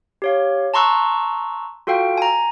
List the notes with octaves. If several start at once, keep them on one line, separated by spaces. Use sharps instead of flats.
G4 C#5 F5
A5 A#5 C6 C#6 E6 F#6
F4 F#4 A4 F5 G5
G#5 A#5